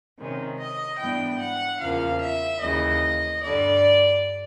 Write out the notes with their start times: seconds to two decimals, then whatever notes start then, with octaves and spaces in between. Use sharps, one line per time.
0.18 C3 D#3 G#3 C#4
0.59 D#5
0.99 G#2 E3 G3 B3 D4 G5
1.40 F#5
1.81 E2 C#3 F3 A#3 F5
2.22 E5
2.63 D#2 C#3 E3 D#5
3.44 G2 D3 G3 D5